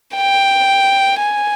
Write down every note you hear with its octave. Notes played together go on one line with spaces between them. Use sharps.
G5
G#5